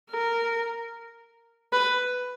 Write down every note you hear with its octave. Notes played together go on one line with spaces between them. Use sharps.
A#4
B4